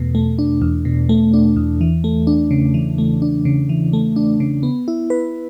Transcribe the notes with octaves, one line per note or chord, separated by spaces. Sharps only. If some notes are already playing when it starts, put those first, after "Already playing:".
Already playing: E2 B2 A3
A3
D4
E2
B2
A3
D4
E2
E3
A3
D4
C#3
E3
A3
D4
C#3
E3
A3
D4
C#3
B3
E4
B4